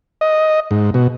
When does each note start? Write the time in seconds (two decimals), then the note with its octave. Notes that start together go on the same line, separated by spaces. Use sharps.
0.21 D#5
0.71 G#2
0.94 B2